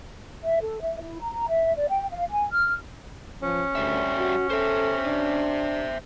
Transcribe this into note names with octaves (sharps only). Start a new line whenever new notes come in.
E5
A4
E5
E4
A#5
A#5
E5
D5
G5
F5
G#5
F6
F3 C#4
D2 G3 E5
F#4
A4 C5 E5
D4